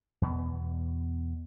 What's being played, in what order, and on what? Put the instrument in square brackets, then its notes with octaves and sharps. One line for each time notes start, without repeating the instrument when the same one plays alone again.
[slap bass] E2 B2 B3